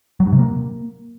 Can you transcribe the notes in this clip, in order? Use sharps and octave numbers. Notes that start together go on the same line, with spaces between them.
F#3
G2
C3
A#3